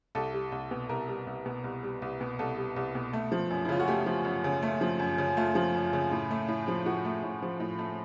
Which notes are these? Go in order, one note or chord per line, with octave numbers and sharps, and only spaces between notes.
C2 A4
G3
C2
B2
C2 A#4
G3
C2
B2
C2
G3
C2
B2
C2 A4
G3
C2
B2
A3
F3
F#2
E4
C#3 F4
F#4
A3 G4
F3
F#2
C#3
A3
F3
F#2
C#3
A3 F4
F3
F#2
C#3
A2
A3
A2
F3
A2 F#4
A3
A2
F3
A2
A3